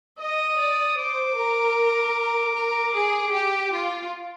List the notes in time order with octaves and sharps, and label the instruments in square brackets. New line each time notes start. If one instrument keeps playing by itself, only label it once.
[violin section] D#5 [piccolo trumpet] D#6
[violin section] D5
[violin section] C5 [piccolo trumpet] D6
[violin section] A#4
A#4
G#4
G4
F4